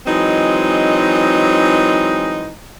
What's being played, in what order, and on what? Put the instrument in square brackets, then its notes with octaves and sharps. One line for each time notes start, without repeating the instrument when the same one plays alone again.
[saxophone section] E3 F#3 G#3 C4 D#4